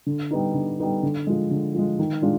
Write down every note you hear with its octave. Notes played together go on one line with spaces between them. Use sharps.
D3
G3 B3 D#4
D3
G3 B3 D#4
D3
F3 G#3
D3
F3 G#3
D#3
G#3 D4 F4